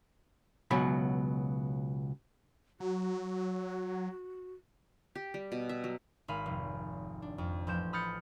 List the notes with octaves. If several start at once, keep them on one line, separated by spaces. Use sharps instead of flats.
C#2 B2 F#3 B5
F#3 F#4
G4
G3
B2
E5
F#3
G#1 F5 B5 D#7
F1
D4
F2
A1 F3 G6 E7
B5 D#6 F6 G6 A6 C#7